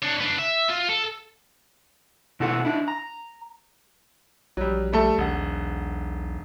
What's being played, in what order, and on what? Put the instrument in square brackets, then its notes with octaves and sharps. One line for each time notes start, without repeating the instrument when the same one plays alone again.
[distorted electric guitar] D4 C#5
B3 D4
E5
F4
A4
[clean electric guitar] B2 E4 F#4 A4 C5 F#5
D4 E4
A#5
[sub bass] A#1 [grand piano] F#3 G3
[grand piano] G3 A3 A4
[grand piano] E1 F#5 [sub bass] B1